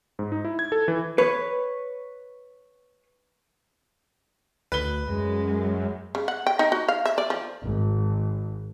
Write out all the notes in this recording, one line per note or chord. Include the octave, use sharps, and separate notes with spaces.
G#2
D#4
E4
G#6
A4
E3
B4 C#5
D2 B4 G7
F#2 G#3
C#3
F#5
G5
D#4
F#4
F5
E5
D5
F3
G#1